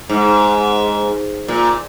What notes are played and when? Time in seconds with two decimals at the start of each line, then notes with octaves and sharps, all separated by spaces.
0.09 G#2
1.48 A#2